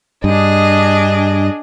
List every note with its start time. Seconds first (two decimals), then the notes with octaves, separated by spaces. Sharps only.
0.24 G2 D4 G#4 D#5